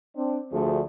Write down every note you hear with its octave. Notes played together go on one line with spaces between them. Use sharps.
C4 D4
D2 D3 F3 A3 F#4 G#4